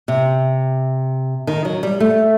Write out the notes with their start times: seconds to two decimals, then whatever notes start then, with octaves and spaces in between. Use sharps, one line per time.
0.08 C3
1.47 D#3
1.65 F#3
1.83 G3
2.00 A3